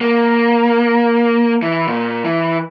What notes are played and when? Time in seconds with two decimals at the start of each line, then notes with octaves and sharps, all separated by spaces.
0.01 A#3
1.62 E3
1.87 A#2
2.25 E3